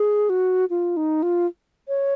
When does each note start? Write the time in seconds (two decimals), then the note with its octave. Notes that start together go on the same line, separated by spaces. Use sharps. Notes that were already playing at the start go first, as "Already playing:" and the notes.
Already playing: G#4
0.29 F#4
0.70 F4
0.97 D#4
1.23 F4
1.88 C#5